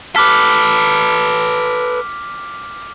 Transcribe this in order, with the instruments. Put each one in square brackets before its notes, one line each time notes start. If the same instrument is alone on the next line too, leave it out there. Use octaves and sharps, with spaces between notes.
[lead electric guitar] A4 B4 [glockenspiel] D6 F6 B6